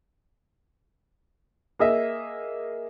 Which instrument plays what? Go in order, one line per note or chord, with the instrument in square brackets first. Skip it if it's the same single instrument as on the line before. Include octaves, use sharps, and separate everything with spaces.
[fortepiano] A#3 G#4 D#5 E5